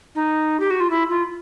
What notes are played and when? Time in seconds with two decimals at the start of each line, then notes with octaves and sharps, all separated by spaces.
0.15 D#4
0.59 G4
0.70 F#4
0.80 F4
0.90 E4
1.09 F4